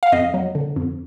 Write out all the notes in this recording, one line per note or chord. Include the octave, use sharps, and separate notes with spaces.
F5
F2 D#5
F#3
D3
F2